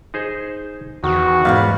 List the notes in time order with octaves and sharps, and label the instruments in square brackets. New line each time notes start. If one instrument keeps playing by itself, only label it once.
[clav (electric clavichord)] D#4 G#4 C5
[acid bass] E2 [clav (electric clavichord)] D#3 [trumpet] F#4
[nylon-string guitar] G#2 B2 F5 [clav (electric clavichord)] G3 B3